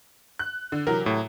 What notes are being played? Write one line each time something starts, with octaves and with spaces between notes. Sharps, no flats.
F#6
D3
C3 E3 F#3 A#4
A2